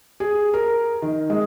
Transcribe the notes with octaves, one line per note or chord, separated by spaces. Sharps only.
G#4
A#4
D#3
G#3